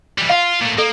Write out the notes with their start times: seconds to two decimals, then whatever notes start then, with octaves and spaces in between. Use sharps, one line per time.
0.18 E3 G3
0.30 F4 F5
0.61 A#2 A3
0.78 A#3 A4